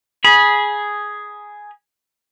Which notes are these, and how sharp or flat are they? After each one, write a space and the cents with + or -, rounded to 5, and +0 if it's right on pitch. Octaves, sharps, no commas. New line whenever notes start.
G#4 +0 B5 -25